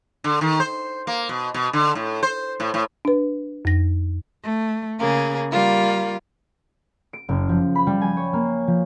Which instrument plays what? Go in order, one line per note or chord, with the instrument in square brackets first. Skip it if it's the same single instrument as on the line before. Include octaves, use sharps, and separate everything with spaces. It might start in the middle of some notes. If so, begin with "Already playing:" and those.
[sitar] D3
D#3
C5
A#3
B2
B2
D3
A2
C5
A2
A2
[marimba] D4 B4
F2 A#6
[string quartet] A3
C#3 A#3 G#4
G3 A#3 F4
[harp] D7
F#1
F3
B5
G3
G#5
C#5
A#3
F3